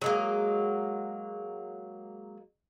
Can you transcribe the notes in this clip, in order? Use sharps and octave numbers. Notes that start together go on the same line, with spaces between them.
F#3 G#3 A#3